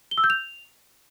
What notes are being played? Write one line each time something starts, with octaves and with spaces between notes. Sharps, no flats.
G7
E6
G6
F7